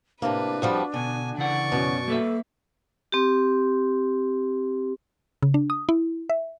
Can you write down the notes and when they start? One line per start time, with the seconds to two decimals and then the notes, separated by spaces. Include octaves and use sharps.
0.22 A2 C3 A#3 D4 B4
0.62 F2 F3 G3 F#4
0.94 B2 D3 G#5
1.38 C#3 E3 D5 F#5 C#6
1.72 F#2 B2 C#4
2.08 A#3 A4 B4 E5
3.12 C4 G4
5.43 C#3
5.54 D4
5.70 D#6
5.89 E4
6.30 E5